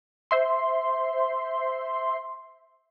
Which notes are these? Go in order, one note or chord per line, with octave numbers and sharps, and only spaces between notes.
C5 E5 C6